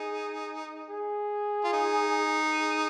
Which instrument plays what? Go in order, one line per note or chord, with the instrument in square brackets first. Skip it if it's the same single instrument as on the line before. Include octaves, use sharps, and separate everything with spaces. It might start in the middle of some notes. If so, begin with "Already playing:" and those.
Already playing: [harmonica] D#4 [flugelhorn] G#4
[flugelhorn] G#4
[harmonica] F4
D#4
[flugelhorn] G#4